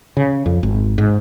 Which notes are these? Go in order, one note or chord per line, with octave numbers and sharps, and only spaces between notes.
C#3
F2
G#1
G#2